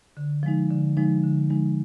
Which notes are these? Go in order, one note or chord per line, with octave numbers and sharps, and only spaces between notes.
D3
F3 G#3 D#4
D3
F3 G#3 D#4
D3
F3 G#3 D#4